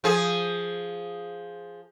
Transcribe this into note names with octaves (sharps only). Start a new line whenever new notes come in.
F3 G#4